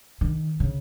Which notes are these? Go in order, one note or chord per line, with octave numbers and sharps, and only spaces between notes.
D#3
C#3